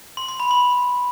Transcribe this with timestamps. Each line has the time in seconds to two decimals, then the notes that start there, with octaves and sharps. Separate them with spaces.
0.17 C6
0.28 C6
0.40 B5
0.51 C6